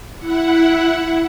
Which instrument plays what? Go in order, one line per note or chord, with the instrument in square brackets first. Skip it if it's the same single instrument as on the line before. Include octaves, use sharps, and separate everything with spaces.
[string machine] E4 F#5